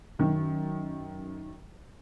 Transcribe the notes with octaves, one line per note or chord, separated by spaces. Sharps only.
F#2 D#3